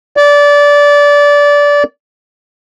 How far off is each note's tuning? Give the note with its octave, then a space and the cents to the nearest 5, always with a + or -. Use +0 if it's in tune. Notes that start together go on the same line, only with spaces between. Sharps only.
D5 -20